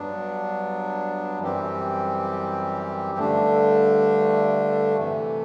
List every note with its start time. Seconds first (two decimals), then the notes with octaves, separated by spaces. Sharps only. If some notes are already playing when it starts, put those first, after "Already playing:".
Already playing: G2 F#3 B3 D4
1.40 F#2 E3 G3 C4 G4
3.18 G2 D3 A3 D4
4.98 C3 E3 A3